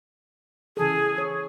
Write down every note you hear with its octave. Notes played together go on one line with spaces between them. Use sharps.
C#3 E3 G#4 A4
C#5